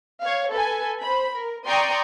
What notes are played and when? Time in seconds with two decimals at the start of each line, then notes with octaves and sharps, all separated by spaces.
0.21 C#5 F5
0.52 A4 B4 G#5
1.01 C5 B5
1.34 A#4
1.66 D5 G5 A#5 C6 C#6 D#6